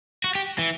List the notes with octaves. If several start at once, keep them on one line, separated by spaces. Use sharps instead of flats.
F#4
G4
E3